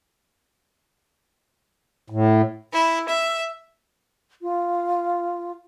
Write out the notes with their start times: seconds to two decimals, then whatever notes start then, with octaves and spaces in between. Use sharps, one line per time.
2.10 A2
2.73 E4
3.08 E5
4.41 F4